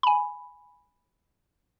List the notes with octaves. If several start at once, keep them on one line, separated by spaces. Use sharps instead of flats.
G#5 B5